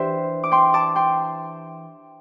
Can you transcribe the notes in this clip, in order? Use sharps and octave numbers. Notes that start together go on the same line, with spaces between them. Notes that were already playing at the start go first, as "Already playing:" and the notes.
Already playing: E3 D4 G4 C5 E5 G5
D6
G5 C6
A5 D6
G5 C6